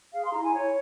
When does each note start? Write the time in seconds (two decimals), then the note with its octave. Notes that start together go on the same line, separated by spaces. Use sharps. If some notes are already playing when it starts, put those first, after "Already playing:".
0.13 G#4 F5
0.24 C6
0.33 E4 A#5
0.44 G#5
0.53 E4 C#5